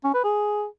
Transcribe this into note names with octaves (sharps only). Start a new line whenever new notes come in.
C#4
B4
G#4